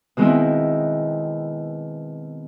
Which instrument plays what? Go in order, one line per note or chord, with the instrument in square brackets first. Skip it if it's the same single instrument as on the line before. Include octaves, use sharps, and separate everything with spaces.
[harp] B2 D#3 G#3 B3 C4 E4